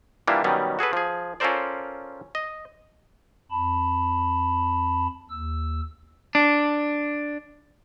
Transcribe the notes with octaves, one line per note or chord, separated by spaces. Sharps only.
E3 G3 A#3 D4 E4 F4
B2 D#3 F#3 G3 C#4
F#4 G#4 A4 B4
F3 G#4
C#4 F4 A4 A#4 C5 D5
D#5
F2 A5 B5
D#2 E6
D4